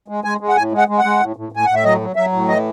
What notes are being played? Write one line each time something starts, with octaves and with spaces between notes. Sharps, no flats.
G#3
G#3 G#5
G#3
F#5
A2 G#5
G#3
F#5
G#3
F#5
G#3
A2
A2
A2 G#5
A2 F#5
E5
F#3 D#5
F#3
F#3 E5
A2
E3 D#5